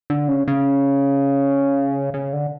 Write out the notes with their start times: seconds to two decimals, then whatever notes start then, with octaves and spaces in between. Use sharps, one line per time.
0.10 D3
0.28 C#3
0.48 C#3
2.14 C#3
2.33 D3